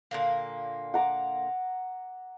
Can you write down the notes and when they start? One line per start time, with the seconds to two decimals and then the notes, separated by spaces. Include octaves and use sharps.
0.11 A#2 D3 A#3
0.94 F#5 A#5 D6